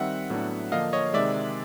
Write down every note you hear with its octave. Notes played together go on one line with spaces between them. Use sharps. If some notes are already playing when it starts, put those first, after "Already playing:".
Already playing: D#3 G3 C4 E5 F#5
A2 F#3 B3 D4
D3 F3 A#3 D4 D#5 F5
C#5 D#5
C3 D#3 G#3 D5 E5